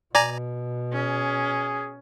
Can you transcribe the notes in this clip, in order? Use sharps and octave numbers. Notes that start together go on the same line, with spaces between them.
B2 D5 G#5 A#5
C#4 G#4